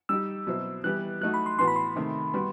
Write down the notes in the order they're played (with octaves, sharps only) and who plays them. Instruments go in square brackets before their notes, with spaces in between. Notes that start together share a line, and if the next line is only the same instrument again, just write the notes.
[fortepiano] G3 D#4 G4 [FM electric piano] E6
[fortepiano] B2 F#3 C4 E4
[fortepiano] E3 G3 B3 E4 G4 [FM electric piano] F#6
[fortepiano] F#3 A3 D#4 F#4 [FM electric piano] F#6
[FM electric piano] B5
C6
[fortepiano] A2 E3 B3 F#4 [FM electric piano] C6
[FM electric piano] B5
C6
[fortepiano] C3 D#3 A3
G3 B3 F#4